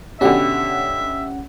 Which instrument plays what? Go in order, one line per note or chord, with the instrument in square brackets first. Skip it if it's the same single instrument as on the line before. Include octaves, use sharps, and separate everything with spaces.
[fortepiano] B2 D3 [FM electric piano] C#4 F#5 [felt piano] G4 G5 [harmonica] E5